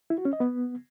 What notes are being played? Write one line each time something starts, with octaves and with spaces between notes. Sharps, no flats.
E4
F#4
C#4
D#5
B3